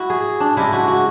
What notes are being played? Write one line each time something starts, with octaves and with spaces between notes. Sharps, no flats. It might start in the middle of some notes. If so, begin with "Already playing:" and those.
Already playing: G#3 E4 F#4
G#4
D4
C#3 G#3 D4 E4
F#4
F#4